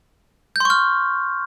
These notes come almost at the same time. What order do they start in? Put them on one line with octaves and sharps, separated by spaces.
G6 C6 C#6 F6